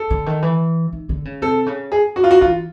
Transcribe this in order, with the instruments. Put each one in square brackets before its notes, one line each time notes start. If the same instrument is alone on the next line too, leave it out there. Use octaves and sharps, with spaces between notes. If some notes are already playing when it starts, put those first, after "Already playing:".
Already playing: [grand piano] A4
[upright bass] D3
D#3
E3
D#3
D3
C#3
[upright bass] C3 [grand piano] A4
[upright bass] C#3
[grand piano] G#4
F#4
F4
F#4
[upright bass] E3 [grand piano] F4